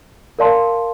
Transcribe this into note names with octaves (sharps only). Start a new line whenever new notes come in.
A#4 D5 F5 A5 C6